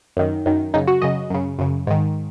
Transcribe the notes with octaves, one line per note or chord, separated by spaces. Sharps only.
F#2 D#3
F#2 D#3
F#2 C#3 D#4
F#4
F#2 C#3 D#5
F#2 C#3
F#2 C#3
G#2 D#3